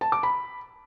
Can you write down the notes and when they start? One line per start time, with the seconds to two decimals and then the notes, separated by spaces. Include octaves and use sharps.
0.01 A5
0.12 D6
0.23 B5